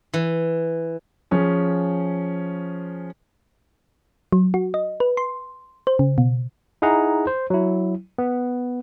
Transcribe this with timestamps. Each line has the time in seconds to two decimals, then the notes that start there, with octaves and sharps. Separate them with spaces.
0.14 E3
1.31 F3 C#4 G#4
4.33 F#3
4.54 F#4
4.74 D#5
5.00 B4
5.17 C6
5.87 C5
5.99 C#3
6.18 B2
6.82 D#4 E4 G#4 F#5 A#5
7.27 C5
7.50 F#3 E4
8.18 B3